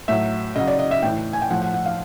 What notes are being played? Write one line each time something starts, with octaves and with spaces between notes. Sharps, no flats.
A2 F#3 E5
C#3 F#3 D#5
D5
D#5
E5
A2 E3 G5
G#5
G5
A2 F3 F#5
F#5
F#5
F5